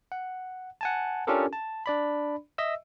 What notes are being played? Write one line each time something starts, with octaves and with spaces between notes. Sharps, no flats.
F#5
F#5 G#5 A5
C#4 D4 F4 G4 A4 A#4
A5
D4 D5 B5
D#5 E5 E6